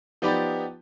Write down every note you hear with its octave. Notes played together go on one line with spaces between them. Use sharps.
F3 B3 D#4 G4 D5 B5